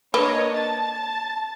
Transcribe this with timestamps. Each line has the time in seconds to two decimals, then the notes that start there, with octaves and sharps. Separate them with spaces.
0.14 A#3 D4 B4 C#5 D#5
0.54 A5 A6